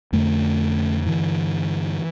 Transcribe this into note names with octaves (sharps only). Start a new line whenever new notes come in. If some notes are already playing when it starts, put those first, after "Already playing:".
F2 D3 A3
G2 D3 E3